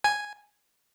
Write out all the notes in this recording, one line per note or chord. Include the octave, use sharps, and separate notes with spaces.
G#5